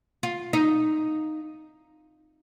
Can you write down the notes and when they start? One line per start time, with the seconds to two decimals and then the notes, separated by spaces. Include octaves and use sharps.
0.23 F4
0.53 D#4